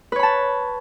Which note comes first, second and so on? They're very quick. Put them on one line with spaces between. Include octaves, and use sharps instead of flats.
B4 C#5 B5 A5